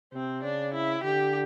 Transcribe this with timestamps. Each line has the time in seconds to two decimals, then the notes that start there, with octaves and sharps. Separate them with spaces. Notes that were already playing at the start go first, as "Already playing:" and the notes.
0.13 C3 C4
0.43 C#3 D4
0.74 E4
1.04 D3 G4